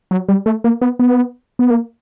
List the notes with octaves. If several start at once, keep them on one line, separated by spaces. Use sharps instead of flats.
F#3
G3
A3
A#3
B3
B3
B3
A#3